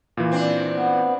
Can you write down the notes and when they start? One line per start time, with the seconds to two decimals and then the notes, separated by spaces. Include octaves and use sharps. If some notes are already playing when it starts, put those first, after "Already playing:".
0.17 A#2 E3
0.32 C4 D4
0.76 B3